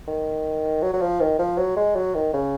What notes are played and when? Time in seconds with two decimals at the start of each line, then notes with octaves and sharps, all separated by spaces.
0.07 D#3
0.82 F#3
0.93 F#3
1.01 F3
1.20 D#3
1.39 F3
1.58 F#3
1.77 G#3
1.96 F#3
2.15 D#3
2.33 C#3